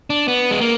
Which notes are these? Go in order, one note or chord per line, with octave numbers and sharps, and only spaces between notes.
D4
B3
G#3
A#3